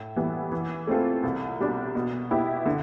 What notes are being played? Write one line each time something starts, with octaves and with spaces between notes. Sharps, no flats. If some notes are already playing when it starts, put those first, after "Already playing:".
Already playing: A2
E3 G3 B3
E3
A3 C4 F4 A4
C2
B2 G3 D4
B2
B3 E4 G4
D3